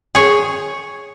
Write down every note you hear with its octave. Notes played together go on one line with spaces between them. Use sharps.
G#4 C#5